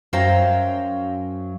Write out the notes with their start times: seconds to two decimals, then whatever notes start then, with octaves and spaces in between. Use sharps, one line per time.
0.13 F#2 F#3 C5 F5 G5 A#5